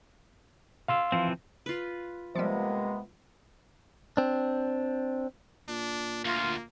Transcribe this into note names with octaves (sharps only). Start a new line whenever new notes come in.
F5 C6 E6
E3 F3 C4
F4 B4
C3 F3 G3 G#3 A#3 B3
C4 D4
A#2 D4
D2 A#3 F4